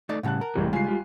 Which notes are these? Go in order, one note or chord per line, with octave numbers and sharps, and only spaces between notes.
A3 D#4 D5
A2 C#3 G3 F#5 A5 F#6
A#4
A1 C3 E3 G3 G#3
C#3 G3 G#3 F4 G#5 C7
G3 F4 G4